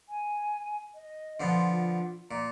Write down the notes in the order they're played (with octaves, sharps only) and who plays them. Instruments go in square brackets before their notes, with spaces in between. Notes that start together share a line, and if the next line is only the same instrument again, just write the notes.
[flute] G#5
D#5
[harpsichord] D3 F3 B3 [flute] C6
[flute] F4
[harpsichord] A#2 [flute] A#5